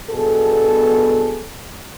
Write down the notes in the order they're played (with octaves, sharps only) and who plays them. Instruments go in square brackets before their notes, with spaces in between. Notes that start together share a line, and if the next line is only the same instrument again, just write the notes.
[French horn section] G2 B2 B3 G#4 A4